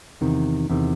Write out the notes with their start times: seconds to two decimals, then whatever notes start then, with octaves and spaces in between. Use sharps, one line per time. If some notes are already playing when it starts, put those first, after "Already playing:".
0.21 E2 C3 D#3
0.69 E2 C3 D#3